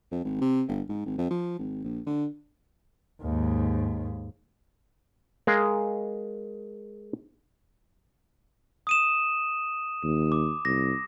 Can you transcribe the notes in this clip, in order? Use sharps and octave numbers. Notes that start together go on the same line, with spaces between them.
F2
G#1
C3
G1
G#2
G#1
F2
F3
G#1
A#1
D3
D#2 G#2
G#3 G#4 A#4 F5
D#6 D#7 E7
D#2
D6
C2 A#6